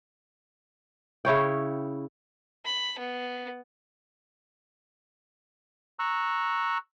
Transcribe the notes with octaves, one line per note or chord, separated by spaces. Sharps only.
C#3 E4 C#5 G5
B5
B3
A#5 C#6 E6 F#6